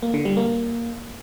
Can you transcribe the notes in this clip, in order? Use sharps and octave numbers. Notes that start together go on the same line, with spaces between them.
A#3
D3
G3
A#3